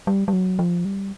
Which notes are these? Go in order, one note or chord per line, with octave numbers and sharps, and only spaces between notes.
G3
G3
F#3
F3
G3